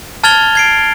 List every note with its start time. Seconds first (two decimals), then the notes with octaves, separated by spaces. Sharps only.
0.24 A5 F6 G#6 A6 F7 G7
0.55 G#6 C7 D7